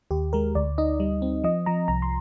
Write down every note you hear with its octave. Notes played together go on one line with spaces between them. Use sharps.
D#2 G4
G#3 A#4
D2 D5
D#4 D#5
G3
C4
F3 D#5
F3 A#5
C2 A#5
C6